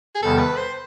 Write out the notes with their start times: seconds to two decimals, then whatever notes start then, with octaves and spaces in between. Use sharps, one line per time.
0.15 G#4
0.22 E2 C3 D#3 G3 B3 A4
0.39 B4
0.56 C5